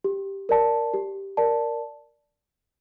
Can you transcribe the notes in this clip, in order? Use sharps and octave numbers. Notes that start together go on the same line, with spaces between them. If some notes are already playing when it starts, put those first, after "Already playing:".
G4
A#4 D5 A5
G4
A#4 D5 A5